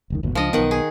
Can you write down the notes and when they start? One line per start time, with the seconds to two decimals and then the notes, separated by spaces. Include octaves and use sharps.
0.10 F1 C#2 D#3
0.23 G1 D#2 B2
0.35 C#2 F3 D4 D#5
0.53 B1 D#3 B3 F#5
0.71 G#4